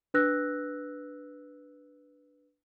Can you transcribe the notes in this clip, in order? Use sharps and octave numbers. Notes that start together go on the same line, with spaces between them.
D4 B4 E6 F#6 A#6